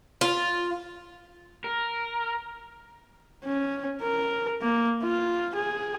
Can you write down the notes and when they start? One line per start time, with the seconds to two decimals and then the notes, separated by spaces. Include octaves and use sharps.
0.21 F4
1.64 A#4
3.44 C#4
4.01 A#4
4.62 A#3
5.03 F4
5.55 G#4